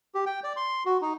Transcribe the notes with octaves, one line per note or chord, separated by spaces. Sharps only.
G4
G5
D5
C6
F#4
D#4